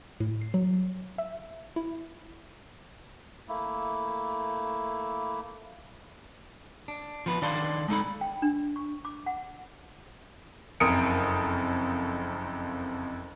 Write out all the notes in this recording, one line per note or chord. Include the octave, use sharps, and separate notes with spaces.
A2
C7
F#3
E5
E4
A3 A#3 E4
D4
F3 B3 B4
D#3 D4 D5 F5 A5 C6
G#3 D#4 A4 B5
G5
D4
C#6
D6
F#5
F#1 F2 A#4 D#6 C#7 D7